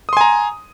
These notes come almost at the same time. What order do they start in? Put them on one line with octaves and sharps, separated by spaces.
D#6 C6 G#5 A#5